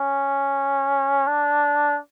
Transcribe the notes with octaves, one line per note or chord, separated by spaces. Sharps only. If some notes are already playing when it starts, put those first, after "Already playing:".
Already playing: C#4
D4